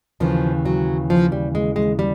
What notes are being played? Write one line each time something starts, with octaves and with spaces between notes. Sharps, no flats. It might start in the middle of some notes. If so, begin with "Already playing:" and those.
D#2 C#3 E3 F3
F#3
F3
G3
G#3
G#3
G3